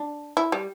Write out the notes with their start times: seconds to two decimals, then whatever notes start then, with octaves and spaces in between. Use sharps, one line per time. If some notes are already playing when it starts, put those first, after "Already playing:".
Already playing: D4
0.37 E4
0.52 G3